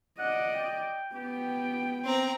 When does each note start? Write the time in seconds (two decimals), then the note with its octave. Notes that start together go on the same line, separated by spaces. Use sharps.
0.19 D5 D#5 F#5
0.55 G5
1.14 B3 G4 G5
2.05 C4 A#5